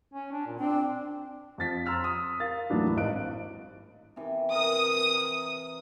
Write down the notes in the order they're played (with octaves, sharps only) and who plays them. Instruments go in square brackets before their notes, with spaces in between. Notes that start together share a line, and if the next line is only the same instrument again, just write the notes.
[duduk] C#4
D4
A#2
[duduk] C4 [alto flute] D4
[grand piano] F2 F3 A6 B6
A#5 C6 E6 F6 B6
D#6
A#4 F5 A6
D#2 A2 E3 F#3 D4
G#1 D#5 F5 F#6 D7
[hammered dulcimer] C3 E3
[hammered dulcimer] A#4 [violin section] D#6